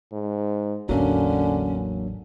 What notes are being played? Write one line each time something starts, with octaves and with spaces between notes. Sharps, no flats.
G#2
A1 E2 D3 F#3 A#3 C#4 D4